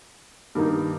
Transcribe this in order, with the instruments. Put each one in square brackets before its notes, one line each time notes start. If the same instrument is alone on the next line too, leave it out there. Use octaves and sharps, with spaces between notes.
[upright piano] G2 D#3 A#3 D#4